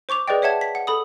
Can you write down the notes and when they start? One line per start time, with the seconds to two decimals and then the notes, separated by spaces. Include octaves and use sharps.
0.09 C5 C#6 D6 F7
0.28 G#4 B4 C5 D5 D#5 G5
0.42 C#5 E5 F#5 A5 G#6
0.61 B6
0.75 F#5
0.87 A4 B5 D#6